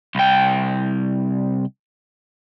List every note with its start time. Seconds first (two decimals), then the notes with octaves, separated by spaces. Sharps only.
0.15 C2 G5